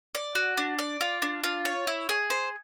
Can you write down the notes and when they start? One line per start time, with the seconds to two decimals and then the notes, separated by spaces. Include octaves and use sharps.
0.15 D5
0.35 F#4
0.57 D4
0.79 D5
1.01 F4
1.22 D4
1.44 F4
1.65 C#5
1.87 E4
2.09 G#4
2.30 C5